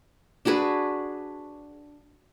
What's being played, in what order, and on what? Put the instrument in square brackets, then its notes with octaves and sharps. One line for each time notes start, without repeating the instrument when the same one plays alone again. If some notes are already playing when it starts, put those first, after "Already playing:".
[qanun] D4 F#4 G#4 B4